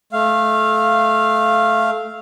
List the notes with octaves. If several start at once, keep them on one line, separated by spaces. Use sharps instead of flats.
A3 F5